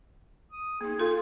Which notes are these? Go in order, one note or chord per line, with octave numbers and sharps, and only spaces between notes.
D#6
A#3 D#4 G#4
A#3 F4 A4 F5